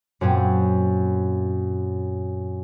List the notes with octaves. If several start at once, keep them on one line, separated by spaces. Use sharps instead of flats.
F#2 A#2 C4 C#4